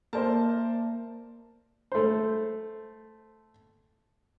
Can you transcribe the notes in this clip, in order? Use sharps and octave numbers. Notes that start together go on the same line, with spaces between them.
A#3 A#4 C5 D5 A5
A3 C5